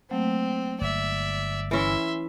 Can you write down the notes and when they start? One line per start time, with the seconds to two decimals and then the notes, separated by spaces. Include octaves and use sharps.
0.11 F#3 A3 A#3 C4
0.81 G1 D5 E5
1.71 E3 C#4 E4 E5 C6